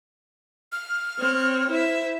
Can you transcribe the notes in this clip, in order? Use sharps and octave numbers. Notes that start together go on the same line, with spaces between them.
F6
C4 C#5
E4 C5 E5